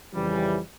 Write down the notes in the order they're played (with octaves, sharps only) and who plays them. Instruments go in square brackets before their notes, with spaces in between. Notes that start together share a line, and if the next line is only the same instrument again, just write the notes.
[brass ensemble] F2 C#3 E3 G3